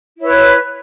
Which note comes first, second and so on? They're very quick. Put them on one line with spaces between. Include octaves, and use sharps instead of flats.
E4 C#5 B4